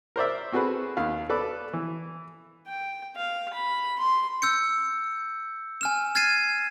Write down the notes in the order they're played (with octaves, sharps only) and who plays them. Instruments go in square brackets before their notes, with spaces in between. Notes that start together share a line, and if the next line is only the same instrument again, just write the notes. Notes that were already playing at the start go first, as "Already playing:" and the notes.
[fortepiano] A#4 C5 D5 E5
C4 F#4 G#4 A4 B4
D#2 F5
A4 B4 D5
E3
[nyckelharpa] G5
F5
B5
C6
[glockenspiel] E6 G6 C#7
G#5 F6 E7
F6 G#6 A6 C7 D#7 E7